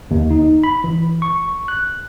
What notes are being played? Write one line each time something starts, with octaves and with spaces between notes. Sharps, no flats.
D#2
D#4
B5
E3
C#6
F#6